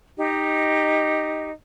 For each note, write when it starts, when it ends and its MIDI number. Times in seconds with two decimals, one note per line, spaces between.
0.17 1.50 63
0.17 1.50 67
0.17 1.50 75